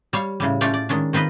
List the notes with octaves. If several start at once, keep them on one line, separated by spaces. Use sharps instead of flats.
G3 C#5 F5
A2 C#3 G3
A3 C#4 F4 C#5 D5 G5
D5
D#3 G#3 C#4 D4
D#3 C4 F4 B4 D#5